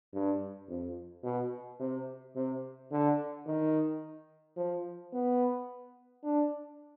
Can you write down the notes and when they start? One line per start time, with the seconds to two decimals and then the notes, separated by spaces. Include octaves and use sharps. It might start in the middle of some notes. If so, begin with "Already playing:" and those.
0.14 G2
0.69 F2
1.23 B2
1.80 C3
2.36 C3
2.91 D3
3.47 D#3
4.57 F3
5.13 B3
6.23 D4